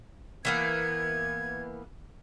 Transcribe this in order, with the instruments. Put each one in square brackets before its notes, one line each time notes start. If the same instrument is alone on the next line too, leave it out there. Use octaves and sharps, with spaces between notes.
[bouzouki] E3 A#3 B3 [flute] G#6